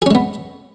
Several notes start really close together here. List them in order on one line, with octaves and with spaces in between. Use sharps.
G#4 C#4 G#3 B3